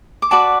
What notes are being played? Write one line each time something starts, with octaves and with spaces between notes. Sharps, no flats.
D6
F#4 B4 D5 A5 C#6